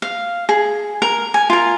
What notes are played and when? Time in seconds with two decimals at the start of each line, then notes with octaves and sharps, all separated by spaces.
0.02 F5
0.49 G#4
1.02 A#4
1.34 G#5
1.50 F4 A#4